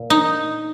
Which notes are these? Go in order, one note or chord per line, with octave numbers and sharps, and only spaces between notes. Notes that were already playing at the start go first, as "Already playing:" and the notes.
Already playing: A#2
D#4